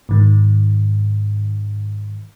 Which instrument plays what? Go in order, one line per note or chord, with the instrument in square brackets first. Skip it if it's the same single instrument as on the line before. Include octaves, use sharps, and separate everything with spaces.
[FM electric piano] G#2 D#3